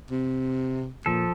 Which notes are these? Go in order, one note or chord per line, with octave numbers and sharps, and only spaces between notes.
C3
A#2 F3 A4